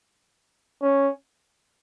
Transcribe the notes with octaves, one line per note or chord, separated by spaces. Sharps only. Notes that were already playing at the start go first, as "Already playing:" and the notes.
C#4